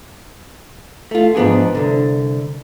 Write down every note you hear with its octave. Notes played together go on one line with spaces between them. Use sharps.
A3 F4
G#2 F3 B3 D4 G#4
C2 D3